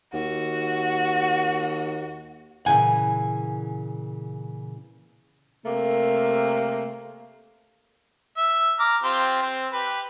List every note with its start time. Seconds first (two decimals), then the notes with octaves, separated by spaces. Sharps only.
0.13 D#2 F#4
2.66 A#2 C#3 E3 F#5 G#5
5.64 C3 A3 A#3
8.38 E5
8.79 A#5 D6 F6
9.03 C4 F4 G4
9.43 C4
9.73 G4 B4